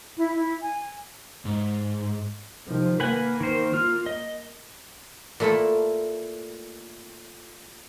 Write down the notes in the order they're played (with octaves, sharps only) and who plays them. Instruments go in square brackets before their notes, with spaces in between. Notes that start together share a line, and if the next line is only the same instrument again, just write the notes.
[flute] E4
E4
G#5
[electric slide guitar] G#2
[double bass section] C3 D#3 F3
[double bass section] A#3 [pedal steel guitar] B4 F#5 G#5
[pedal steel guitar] D#3 C5
F4 F6
D#5
[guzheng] A#2 A3 E4 A4